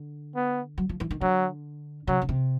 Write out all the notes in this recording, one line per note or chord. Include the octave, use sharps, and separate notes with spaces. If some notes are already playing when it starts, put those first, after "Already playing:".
Already playing: D3
B3
F#3
F3
E3
D#3
D3 F#3
C#3 F#3
C#3
C3